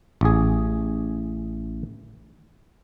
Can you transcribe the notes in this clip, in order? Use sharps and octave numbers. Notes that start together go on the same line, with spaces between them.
A1 G#4